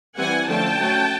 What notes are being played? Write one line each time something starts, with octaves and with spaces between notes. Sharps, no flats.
E3 G3 C4 F#5 G#5
D3 F3 A3 C#4 G5 A5
F#3 A3 C#4